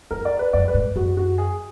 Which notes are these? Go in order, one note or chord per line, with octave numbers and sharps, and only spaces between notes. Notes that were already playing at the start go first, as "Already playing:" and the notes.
F#2 A#4
D5
B4
F#2 D5
B4
G#2
F#2 F#4
F#4
G#4